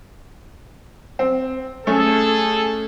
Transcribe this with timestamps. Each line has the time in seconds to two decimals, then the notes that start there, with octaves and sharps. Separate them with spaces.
1.19 C4
1.87 A3 C#4 G#4 A4